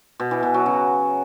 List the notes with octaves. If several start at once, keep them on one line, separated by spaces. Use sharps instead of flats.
B2
E3
B2
F#3
C#3